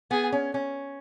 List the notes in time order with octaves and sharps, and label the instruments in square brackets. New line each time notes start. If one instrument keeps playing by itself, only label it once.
[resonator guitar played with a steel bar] B3 [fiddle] G#4
[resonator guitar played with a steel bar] C#4
C#4